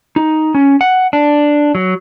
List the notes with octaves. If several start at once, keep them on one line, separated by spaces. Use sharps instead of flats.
D#4
C#4
F#5
D4
F#3